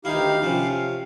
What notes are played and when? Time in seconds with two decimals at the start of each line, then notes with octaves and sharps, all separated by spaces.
0.05 D2 D#3 D#4 E4 G4 F5
0.42 C3 F3 C#4